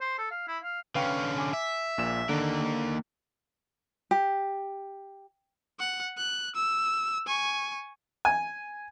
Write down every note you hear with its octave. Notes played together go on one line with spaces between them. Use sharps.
C5
A4
F5
E4
F5
D3 C#4 B4 F5 G5
G#5 D6
E5
A#1 A#2 E7
D3 D#3 A#3
G4
F#5
F#6
E6
G#5 C#6
G#5